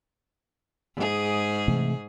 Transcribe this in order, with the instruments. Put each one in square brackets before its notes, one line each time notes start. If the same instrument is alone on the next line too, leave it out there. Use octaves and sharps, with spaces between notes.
[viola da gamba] G#2 G#4
[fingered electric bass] C3 E3 A3